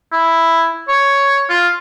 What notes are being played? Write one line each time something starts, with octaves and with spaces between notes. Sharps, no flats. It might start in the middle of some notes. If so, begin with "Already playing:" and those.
E4
C#5
F4